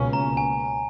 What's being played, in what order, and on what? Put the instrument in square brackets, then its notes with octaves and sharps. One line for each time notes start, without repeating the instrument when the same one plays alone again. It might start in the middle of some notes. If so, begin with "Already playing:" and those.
Already playing: [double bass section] C#2 B2 A#3 C#4
[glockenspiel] A#5
G#5